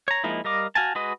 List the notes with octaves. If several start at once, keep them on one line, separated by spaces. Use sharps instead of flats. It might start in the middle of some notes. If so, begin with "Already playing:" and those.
C#5 A#5
F3 G#3 A#3 D#4 E4
G3 A#4 D#5 F5 D6
F#4 F5 G#5 A5
G#3 F#4 B4 D#5